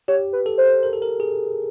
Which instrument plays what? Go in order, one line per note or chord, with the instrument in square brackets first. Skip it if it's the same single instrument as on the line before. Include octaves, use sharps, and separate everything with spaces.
[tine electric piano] G4 [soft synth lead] C#5
[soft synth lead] B4
[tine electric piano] A4
[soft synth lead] C5
[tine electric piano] A#4
A4
A#4
G#4